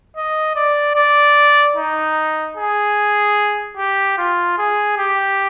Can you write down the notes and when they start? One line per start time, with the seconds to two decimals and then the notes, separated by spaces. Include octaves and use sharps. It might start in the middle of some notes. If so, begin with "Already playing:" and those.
0.17 D#5
0.56 D5
0.96 D5
1.76 D#4
2.57 G#4
3.77 G4
4.18 F4
4.58 G#4
4.98 G4